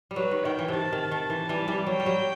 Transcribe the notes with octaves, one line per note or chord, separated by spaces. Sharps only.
G3
F#3 B4
D#3
D#3 G5
E3
C3 D#3 A5
D#3
A5
D#3
E3
E3 G3
E3 G3
F#3 G5
G3
F#3